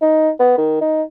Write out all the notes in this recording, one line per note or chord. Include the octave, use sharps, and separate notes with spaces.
D#4
B3
D#3
D#4